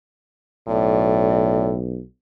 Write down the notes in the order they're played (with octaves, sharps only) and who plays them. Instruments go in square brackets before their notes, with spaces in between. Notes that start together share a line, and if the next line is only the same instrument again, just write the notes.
[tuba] B1 [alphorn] A2 [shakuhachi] D5